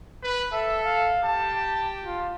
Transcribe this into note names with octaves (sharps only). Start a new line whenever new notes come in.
B4
A4 E5
F5
G4 A5
F4